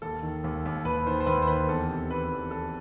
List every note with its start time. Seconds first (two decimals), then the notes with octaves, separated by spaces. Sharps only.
0.02 D#2 A4
0.23 D#3
0.44 D#2
0.65 D#2
0.85 D#2 B4
1.06 D#3 C5
1.20 C5
1.26 D#2 B4
1.42 C5
1.48 D#3 B4
1.69 E2 A4
1.89 C3
2.11 E2 B4
2.30 E2
2.51 E2 A4